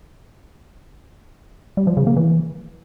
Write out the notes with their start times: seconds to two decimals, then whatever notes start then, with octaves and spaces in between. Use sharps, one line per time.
1.77 G3
1.87 F3
1.97 C#3
2.07 A#3
2.17 E3